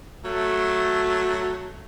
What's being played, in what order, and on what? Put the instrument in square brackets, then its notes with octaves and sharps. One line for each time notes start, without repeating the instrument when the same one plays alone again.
[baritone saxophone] F#3 [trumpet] A3